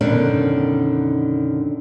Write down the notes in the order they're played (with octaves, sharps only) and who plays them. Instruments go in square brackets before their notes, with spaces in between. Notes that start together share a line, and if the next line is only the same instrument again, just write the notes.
[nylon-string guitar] F#2 B2 D3 D#3 C#4 D4